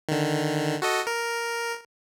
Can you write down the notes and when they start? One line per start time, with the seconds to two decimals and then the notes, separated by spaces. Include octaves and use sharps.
0.09 D3 D#3
0.82 F#4 A4 D#5
1.07 A#4